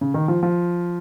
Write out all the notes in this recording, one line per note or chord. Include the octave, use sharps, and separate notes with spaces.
C#3
D#3
F3
F3